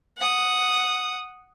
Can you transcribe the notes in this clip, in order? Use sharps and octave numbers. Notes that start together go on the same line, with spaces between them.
F#5 D#6